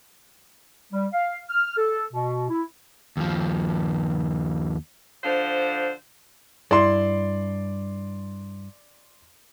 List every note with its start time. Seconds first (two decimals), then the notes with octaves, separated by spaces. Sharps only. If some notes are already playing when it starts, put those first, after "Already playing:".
0.92 G3
1.13 F5
1.49 F6
1.77 A4
2.13 B2
2.50 E4
3.17 D#2 F3
5.23 D3 F3 C5
6.71 G2 E4 D5 C6